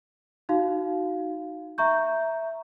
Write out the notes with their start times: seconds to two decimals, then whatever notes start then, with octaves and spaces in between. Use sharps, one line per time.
0.49 D#4 F#4 F5
1.78 E5 A#5 C#6 G6